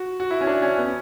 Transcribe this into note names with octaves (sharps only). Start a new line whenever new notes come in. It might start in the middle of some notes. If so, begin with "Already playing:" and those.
Already playing: F#4
F#4
E4
C#4
D4
C#4
B3
C#4